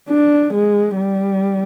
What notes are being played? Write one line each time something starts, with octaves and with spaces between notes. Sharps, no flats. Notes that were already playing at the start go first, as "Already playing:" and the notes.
D4
G#3
G3